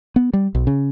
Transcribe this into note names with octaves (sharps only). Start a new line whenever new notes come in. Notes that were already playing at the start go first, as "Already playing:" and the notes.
B3
G3
B1
C#3